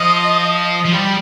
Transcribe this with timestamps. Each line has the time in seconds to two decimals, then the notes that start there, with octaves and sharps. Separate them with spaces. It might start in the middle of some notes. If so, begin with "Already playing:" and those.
Already playing: F3 D#5
0.85 F3
0.93 G3